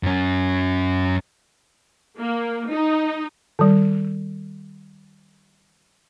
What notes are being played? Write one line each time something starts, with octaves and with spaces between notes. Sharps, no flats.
F#2 C#4
A#3
D#4
D#3 G3